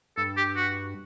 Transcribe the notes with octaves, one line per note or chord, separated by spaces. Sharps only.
G2 A4
G4
F#4